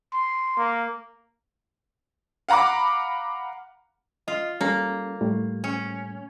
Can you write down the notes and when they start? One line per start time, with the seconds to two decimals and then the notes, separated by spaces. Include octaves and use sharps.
0.13 C6
0.57 A#3
2.49 F5 F#5 A#5 B5 D6
4.28 F4 D#5
4.61 G3 A#3 C#4 A4
5.21 A2 G3 A3
5.64 C#4